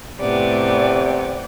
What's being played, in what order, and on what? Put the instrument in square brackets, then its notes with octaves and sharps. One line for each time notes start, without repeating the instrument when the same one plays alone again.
[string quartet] A2 B3 [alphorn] C3 [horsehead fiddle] D5 G5